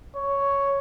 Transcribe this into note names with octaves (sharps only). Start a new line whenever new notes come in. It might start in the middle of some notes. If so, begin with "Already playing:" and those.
C#5